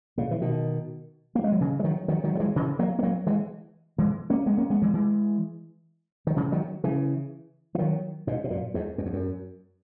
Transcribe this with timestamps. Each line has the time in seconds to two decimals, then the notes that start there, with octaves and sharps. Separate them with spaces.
0.18 A#2 C#3
0.31 E3
0.41 B2 D#3
1.35 A#3
1.44 G#3
1.52 F#3
1.60 C#3 E3
1.80 G#3
1.84 D#3 F#3
2.08 D#3 F#3
2.24 D#3 F#3
2.35 F#3
2.40 E3 G#3
2.56 C#3 E3
2.79 F#3 A#3
2.99 B3
3.03 F#3 A#3
3.27 E3 G#3
3.98 E3 G#3
4.30 A#3 C#4
4.46 G#3 B3
4.58 A#3 C#4
4.70 G#3 B3
4.82 E3 G#3
4.93 E3 G#3
6.27 D#3
6.36 C#3 E3
6.52 D#3 F#3
6.84 C#3 E3
7.75 E3
7.79 D#3 F#3
8.27 G#2 B2
8.44 B2
8.50 F#2 A#2
8.74 E2 G#2
8.98 F#2
9.06 E2
9.13 F#2